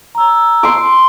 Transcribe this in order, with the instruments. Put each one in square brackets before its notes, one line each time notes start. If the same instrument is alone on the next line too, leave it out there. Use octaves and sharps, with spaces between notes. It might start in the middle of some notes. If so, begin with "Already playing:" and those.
[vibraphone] A#5 E6
[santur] C6 D6